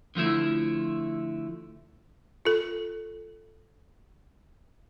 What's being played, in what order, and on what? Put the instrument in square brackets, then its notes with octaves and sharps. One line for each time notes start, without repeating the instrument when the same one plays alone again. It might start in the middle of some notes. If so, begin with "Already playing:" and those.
[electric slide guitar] D3 F3 A3 E4
[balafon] F4 A4